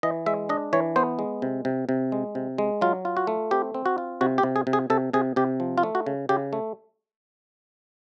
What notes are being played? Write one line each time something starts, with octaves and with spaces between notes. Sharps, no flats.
E3 D#5
G#3 E5
D4 D#5
E3 C#5
B3 C5
G#3
C3
C3
C3
G#3
C3
G#3
F#3 F4
F4
F#4
A3
C4 G4
C4
F#4
F4
C3 F#4
G4
C3
G#4
C3
G#4
C3 A4
C3 G#4
C3 G4
F3
F4
A3
F#4
C#3
C#3 G4
A3